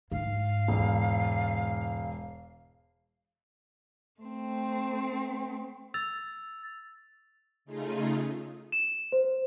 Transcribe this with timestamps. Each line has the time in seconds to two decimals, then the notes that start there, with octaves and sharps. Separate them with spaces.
0.11 G#2 F5
0.68 E1
4.21 A3 C4
5.94 E6 A6 F7
7.65 C#3 A3 D#4 F4 G#4
8.72 E7
9.12 C5